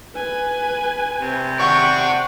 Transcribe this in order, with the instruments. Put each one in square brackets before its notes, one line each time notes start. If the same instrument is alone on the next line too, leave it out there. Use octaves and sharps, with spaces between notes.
[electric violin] B4 G#5
[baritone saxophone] C3
[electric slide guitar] D5 F#5 [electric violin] G5 F#6 [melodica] C#6